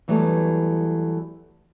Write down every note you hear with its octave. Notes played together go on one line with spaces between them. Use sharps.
E2 E3 F#3 G3 A3